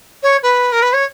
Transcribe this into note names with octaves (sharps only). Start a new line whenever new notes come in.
C#5
B4
A#4
B4
C#5